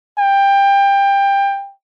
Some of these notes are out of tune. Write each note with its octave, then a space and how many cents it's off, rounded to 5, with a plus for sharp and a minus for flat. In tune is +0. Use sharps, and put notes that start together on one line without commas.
G5 +20